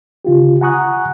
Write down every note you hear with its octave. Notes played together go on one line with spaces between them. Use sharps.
C#3 F4 G4
F#5 G#5 A#5 C#6 D#6 F#6